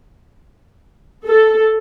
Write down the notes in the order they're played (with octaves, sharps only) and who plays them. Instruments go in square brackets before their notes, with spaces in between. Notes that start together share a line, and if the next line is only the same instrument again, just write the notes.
[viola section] A4